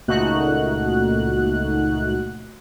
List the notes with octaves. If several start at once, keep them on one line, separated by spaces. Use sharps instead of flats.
C#2 A#2 A3 D#4 F#4 F#6